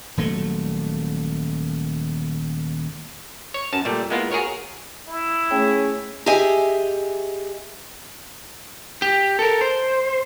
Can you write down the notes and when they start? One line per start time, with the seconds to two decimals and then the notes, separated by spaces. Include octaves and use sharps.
0.17 D#1 F#3 A3
3.54 C#5
3.73 F#2 A5
3.85 A#2 G3 A3
4.10 G#3 A#3 B3 E4 F4
4.31 F#4 G#4 A#4 C#5
5.08 E4
5.51 A3 C#4 G#4 C#5 G5
6.26 G4 G#4 D#5 E5 G#5
9.02 G4
9.39 A4 A#4
9.61 C5